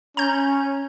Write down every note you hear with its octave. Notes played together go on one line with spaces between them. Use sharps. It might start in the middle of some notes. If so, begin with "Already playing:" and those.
C#4 A#5 G6